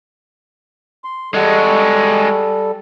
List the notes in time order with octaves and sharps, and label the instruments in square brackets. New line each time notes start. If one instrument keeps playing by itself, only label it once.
[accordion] C6
[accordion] G3 A4 [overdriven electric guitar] G#3 F#4